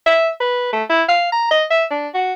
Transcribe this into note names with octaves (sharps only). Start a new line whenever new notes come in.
E5
B4
A3
E4
F5
A#5
D#5
E5
D4
F#4